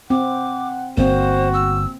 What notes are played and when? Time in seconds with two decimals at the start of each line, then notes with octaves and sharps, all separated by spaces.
0.10 C4 F#5 D6
0.97 G1 A#3 C4 F#4 C5
1.54 E6